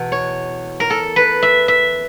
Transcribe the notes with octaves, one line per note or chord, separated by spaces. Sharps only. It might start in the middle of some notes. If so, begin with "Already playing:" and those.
Already playing: E2 B2
C#5
A#4
A4
B4
E5
E5